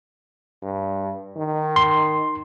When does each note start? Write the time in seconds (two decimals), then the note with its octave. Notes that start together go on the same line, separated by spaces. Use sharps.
0.62 G2
1.36 D#3
1.76 C6